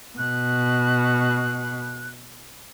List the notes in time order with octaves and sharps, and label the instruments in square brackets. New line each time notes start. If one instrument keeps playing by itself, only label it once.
[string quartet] B2 [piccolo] F#6